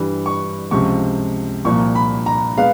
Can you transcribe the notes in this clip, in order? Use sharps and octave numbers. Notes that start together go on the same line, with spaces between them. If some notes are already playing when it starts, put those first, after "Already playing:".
Already playing: G2 E3 G3
C#6
C#2 C3 F3 C#6
C2 A#2 F3 A#3 C#6
B5
A#5
G#3 B3 F5